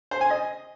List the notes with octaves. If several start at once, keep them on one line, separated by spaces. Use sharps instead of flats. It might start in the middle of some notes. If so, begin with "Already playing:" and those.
C5
G#5
D#5